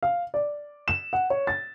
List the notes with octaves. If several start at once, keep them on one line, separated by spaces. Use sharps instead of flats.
F5
D5
E7
F#5
C#5
A6